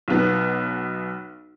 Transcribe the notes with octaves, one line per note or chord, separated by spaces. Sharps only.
B1 B3